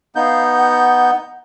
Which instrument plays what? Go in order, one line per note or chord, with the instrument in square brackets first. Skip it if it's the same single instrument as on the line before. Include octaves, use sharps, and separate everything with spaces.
[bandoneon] B3 D#4 G6 [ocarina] F5
[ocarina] F#5